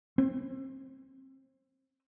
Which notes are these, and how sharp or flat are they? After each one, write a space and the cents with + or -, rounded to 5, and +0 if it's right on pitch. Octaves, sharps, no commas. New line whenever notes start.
C4 +30